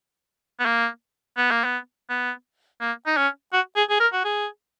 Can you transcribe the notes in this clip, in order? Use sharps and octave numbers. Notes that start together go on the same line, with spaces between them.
B3
A#3
B3
A#3
B3
B3
A#3
D#4
C#4
F#4
G#4
G#4
A#4
F#4
G#4